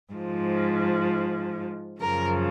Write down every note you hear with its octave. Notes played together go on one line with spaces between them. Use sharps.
G#2 F3
F#2 C#3 F3 A#4